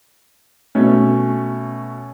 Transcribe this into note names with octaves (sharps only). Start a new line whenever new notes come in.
B2 A3 C#4